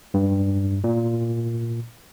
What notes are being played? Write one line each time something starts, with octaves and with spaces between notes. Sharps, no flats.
G2
A#2